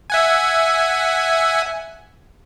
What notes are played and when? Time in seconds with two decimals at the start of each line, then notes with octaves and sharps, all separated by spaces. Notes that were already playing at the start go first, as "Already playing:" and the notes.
0.10 E5 F#5 G#5